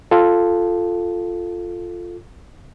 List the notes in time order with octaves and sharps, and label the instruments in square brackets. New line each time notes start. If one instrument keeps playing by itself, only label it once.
[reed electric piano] F4 A4